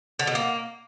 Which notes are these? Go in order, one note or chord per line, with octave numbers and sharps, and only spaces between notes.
D3
B2
A#3